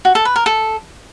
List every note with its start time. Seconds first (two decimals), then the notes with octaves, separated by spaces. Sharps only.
0.05 F#4
0.15 A4
0.25 B4
0.36 A#4
0.46 A4